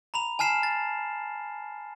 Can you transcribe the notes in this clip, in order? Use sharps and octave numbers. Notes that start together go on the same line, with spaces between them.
A#5 B5 F7
G#5 A5 F6 C7 E7
A6